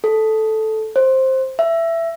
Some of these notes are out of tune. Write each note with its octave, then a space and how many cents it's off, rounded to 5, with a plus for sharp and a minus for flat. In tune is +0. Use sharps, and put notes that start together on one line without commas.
A4 -5
C5 +10
E5 +15